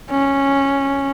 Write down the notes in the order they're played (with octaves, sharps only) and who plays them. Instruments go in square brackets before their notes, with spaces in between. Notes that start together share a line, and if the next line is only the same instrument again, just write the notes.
[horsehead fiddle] C#4